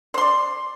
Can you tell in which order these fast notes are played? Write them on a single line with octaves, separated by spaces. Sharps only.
C5 C6 D5